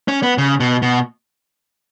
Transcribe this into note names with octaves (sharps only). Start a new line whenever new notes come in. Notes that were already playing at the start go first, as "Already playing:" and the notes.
C#4
B3
C#3
B2
B2